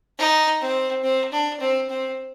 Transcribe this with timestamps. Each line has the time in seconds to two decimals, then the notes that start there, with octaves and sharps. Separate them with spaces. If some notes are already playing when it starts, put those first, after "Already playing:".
0.18 D#4
0.61 C4
1.03 C4
1.32 D4
1.60 C4
1.89 C4